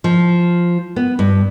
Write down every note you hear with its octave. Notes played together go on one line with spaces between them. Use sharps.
F3
B3
G2